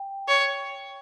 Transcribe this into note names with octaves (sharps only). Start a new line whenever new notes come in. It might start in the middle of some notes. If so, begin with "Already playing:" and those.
Already playing: G5
C#5